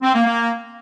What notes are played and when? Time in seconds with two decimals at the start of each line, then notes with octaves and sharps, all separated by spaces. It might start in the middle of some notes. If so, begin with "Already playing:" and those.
0.02 C4
0.14 A#3
0.26 A#3